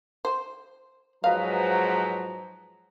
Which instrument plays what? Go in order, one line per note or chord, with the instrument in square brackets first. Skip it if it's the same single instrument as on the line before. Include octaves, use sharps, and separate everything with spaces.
[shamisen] C5
[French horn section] G#2 F3 F#3 [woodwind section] B4 D#5 A#5 [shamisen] F5